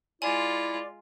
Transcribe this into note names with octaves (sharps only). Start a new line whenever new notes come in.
G#3 E4 F4 D5 G#5